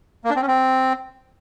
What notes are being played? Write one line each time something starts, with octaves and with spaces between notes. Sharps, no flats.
A#3
D4
C4
C#4
C4